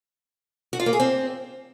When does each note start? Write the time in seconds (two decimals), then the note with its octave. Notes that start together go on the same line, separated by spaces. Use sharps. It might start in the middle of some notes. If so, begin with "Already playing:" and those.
0.73 F#4
0.80 F4
0.86 A#3
0.93 G#4
1.00 C4